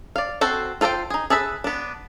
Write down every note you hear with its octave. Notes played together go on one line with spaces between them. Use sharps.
D5 F5
C4 F#4 A4 C5
F4 A4 C5 D5 G5
D#4 G#4
G#4 A4 B4 E5
B3 D4